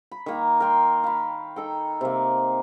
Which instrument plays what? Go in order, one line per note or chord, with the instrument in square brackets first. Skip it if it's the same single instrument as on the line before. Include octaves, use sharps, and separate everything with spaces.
[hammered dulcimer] B5
D#3 A#3 A#4
A#4 G5 C6
F5 B5
D#4 A4 G5
C3 A#3